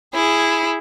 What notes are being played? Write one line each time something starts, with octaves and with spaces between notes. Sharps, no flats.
E4 G#4